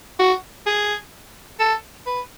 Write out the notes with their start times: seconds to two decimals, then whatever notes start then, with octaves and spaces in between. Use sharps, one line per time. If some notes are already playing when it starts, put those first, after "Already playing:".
0.19 F#4
0.66 G#4
1.59 A4
2.06 B4